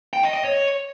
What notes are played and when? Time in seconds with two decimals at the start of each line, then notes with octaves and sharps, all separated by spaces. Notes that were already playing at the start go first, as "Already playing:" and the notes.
0.13 G5
0.24 D#5
0.34 D#5
0.45 C#5